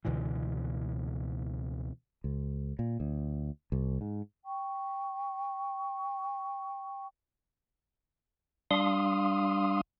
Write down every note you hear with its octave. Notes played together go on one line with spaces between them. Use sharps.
C#2 B2 D3 E3
C#2
A#2
D2
C2
G#2
G5 C#6
G3 D4 F5 C6 D#6